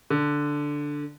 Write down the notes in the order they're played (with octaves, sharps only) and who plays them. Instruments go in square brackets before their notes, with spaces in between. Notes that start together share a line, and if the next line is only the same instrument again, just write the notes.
[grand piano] D3